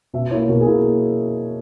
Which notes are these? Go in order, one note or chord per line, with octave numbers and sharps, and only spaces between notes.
B2 E5
A#3 E4 C#5
B2 A#4
G#4
A#3 E4